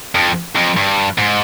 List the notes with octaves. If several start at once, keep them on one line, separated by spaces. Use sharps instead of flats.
F2
F2
G2
G#2